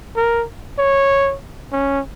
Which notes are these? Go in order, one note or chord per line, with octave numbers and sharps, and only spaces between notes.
A#4
C#5
C#4